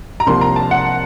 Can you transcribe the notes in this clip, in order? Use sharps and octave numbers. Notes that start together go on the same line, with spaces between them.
A#5
C2 C3 F3 A#3 C6
A#5
A5
F#5